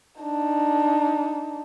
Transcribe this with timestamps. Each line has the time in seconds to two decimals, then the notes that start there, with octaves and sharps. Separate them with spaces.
0.21 D4 D#4